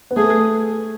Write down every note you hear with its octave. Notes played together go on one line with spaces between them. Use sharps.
B3
A3 G#4